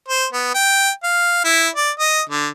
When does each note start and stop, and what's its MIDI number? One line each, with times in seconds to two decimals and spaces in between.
0.08 0.25 72
0.33 0.52 59
0.55 0.90 79
1.03 1.40 77
1.44 1.69 64
1.75 1.91 74
2.00 2.21 75
2.30 2.48 50